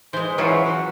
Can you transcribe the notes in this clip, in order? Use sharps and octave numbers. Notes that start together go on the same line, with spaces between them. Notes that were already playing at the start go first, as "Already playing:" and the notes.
E3 G#3 C5
E3 F#3 C#4 F4
F#4